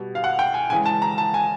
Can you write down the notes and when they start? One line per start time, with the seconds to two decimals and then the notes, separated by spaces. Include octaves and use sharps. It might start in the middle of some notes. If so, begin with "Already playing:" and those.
Already playing: B2 G3
0.15 F5
0.24 F#5
0.39 G5
0.54 G#5
0.70 C#3 E3 G#3 G#5
0.86 A5
1.02 A#5
1.18 A5
1.34 G#5